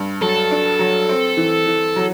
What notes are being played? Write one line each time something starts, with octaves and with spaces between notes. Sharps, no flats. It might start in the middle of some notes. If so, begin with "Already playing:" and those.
Already playing: G2
F#3 A4
D4
F#3
C4
E3
E3
F#3